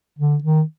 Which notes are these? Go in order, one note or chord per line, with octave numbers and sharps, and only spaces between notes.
D3
D#3